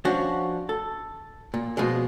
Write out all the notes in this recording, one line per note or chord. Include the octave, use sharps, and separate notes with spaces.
F3 C#4 D4 F#4
A4
A#2
B2 F3 G#3